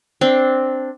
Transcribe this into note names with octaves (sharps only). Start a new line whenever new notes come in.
C4 D4